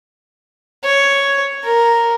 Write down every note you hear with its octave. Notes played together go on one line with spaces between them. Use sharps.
C#5
A#4